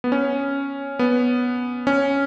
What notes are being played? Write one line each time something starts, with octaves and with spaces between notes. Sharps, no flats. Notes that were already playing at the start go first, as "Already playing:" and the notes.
B3
C#4
B3
C#4